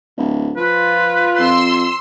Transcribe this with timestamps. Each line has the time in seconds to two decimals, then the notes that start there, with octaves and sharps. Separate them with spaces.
0.17 D1
0.57 F3 F4 B4
1.39 F2 C6 E6